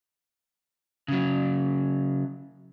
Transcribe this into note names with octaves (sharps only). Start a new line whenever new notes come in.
C#3 F#3